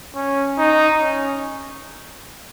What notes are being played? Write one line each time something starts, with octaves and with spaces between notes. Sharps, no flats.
C#4
D#4
C#4